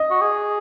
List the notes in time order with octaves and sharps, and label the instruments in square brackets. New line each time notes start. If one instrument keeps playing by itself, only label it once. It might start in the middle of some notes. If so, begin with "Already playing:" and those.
Already playing: [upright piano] D#5
[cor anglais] F#4
G#4